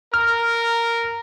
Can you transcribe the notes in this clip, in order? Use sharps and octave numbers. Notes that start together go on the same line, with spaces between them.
A#4 F6